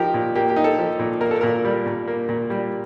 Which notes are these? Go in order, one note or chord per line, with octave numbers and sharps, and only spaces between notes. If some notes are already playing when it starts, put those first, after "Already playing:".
Already playing: F3 D#4 G4 A#4
A#2
A#3 G4
G4
D#4
A4
F3
A#2
A#3 A#4
A4
A#2 A#4
G3
A#2
A#3
A#2
G3